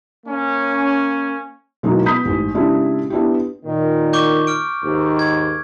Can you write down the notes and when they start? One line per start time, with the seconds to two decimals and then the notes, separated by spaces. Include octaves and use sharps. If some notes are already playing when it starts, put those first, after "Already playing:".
0.25 A#3 C#4
1.83 B2 F#3 G#3 A#3 D#4 E4
2.05 B3 B5 D#6 G6 B6
2.25 A1 G#2
2.54 C#3 G#3 C4 D4 E4 G4
3.10 B3 D4 E4 G4
3.65 A#2 D#3
4.13 C#6 D6 G6
4.47 F6 D7
4.83 D#2 G#2
5.19 G#6